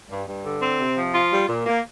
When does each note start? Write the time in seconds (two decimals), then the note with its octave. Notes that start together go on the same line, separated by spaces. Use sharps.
0.10 G2
0.27 G2
0.44 D3
0.62 C4
0.80 C3
0.97 F3
1.14 F4
1.33 G3
1.49 A#2
1.66 A#3